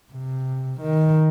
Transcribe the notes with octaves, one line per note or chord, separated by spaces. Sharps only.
C3
D#3